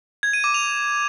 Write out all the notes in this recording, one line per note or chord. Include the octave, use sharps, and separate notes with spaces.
G#6
D#7
D6
F7